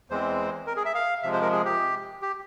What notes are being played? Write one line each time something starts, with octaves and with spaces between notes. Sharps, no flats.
E2 E3 G#3 C4 C5
A#4
G#4
E5
F5
C3 F3 G#3 E5
C5
A#4
G#4
G4
G4